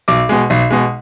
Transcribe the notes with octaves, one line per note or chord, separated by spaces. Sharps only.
B1 D6
B2 G#3
B1
B2 G#3